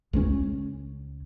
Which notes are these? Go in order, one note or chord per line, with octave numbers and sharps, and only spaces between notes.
C#2 F3 C#4